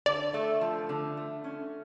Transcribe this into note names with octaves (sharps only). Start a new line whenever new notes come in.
D3 D5
A3
F3
D3
A3
C#4